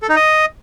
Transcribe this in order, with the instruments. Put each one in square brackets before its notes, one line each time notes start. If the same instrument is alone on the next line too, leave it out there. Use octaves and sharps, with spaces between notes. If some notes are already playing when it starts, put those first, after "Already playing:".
[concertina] A4
D#4
D#5